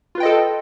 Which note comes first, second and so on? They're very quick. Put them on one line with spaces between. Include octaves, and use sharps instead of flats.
F4 B4 G5 D#5 A4